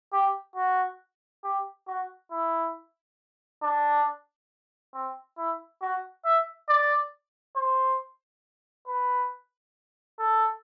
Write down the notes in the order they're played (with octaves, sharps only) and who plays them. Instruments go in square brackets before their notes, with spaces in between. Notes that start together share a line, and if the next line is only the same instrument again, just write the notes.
[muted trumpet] G4
F#4
G4
F#4
E4
D4
C4
E4
F#4
E5
D5
C5
B4
A4